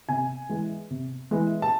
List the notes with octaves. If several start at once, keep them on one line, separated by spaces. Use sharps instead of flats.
C3 G#5
E3 G#3
C3
E3 G#3
A5